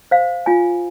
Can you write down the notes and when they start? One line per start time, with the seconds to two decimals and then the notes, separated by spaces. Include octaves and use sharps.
0.11 C5 F5
0.46 F4 G#5